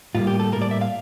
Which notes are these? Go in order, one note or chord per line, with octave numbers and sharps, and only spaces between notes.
A2 G3 A#3 F4
G4
A4
A2 G3 A#3 A#4
D5
E5
F5